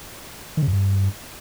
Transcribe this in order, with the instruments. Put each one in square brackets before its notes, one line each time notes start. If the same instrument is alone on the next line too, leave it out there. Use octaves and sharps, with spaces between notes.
[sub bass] D#3
C#3
F#2
G2